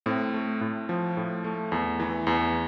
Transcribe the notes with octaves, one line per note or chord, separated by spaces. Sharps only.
A2 C4
A3
A2
F3
A2
A3
E2
E3
E2